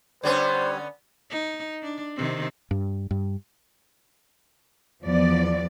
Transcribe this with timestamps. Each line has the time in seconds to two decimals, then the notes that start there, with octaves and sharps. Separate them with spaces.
0.23 D3 G3 B3 C#4 C5 C#5
1.30 D#4
1.83 D4
2.16 C3 D#3 C4
2.71 G2
3.11 G2
5.02 E2 F3 B3 D5